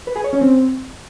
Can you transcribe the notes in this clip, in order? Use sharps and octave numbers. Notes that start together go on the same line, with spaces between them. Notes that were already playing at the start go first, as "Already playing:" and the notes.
B4
G#4
C#5
C#4
C4